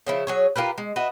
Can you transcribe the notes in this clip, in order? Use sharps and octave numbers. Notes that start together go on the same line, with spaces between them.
C#3 F3 E4
F#3 G#4 C#5
F4 G4 A#4 B4
G#3
F#4 B4 D#5 E5